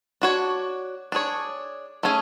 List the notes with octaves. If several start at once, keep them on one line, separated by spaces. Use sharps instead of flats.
D4 F#4 C#5
D4 G#4 C#5
A3 C#4 G#4